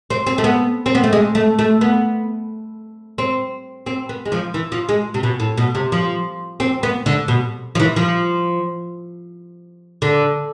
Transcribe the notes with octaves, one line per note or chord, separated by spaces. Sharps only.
C4
C4
A3
B3
C4
B3
A3
G#3
A3
A3
B3
C4
C4
B3
G#3
F3
E3
F3
G#3
C3
B2
A2
B2
C3
F3
C4
B3
D3
B2
F3
E3
F3
D3